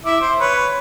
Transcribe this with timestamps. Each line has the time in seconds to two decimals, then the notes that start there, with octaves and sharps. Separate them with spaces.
0.05 E4 E5 D6
0.21 C5
0.40 B4 C#5 B5